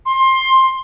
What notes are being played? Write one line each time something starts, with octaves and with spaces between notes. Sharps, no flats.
C6